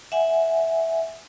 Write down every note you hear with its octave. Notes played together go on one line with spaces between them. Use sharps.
E5 F#5 G#5